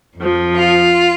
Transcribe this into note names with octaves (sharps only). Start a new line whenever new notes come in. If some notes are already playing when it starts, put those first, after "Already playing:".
F2 F3
F4